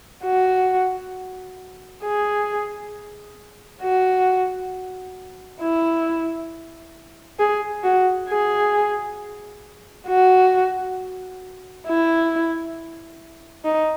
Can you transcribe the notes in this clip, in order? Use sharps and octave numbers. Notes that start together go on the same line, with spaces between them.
F#4
G#4
F#4
E4
G#4
F#4
G#4
F#4
E4
D#4